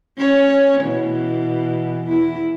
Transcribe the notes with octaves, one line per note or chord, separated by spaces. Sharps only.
C#4 C#5
B2 E3
E2 E4